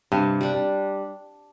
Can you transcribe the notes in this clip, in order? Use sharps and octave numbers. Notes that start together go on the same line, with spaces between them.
G2 C3
G3 D4